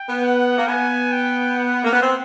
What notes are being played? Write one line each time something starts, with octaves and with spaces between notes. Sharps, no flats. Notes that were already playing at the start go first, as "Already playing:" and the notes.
Already playing: G5
B3
F#5
A#3
B3 G#5
G5
F#5
A#3
B3
C4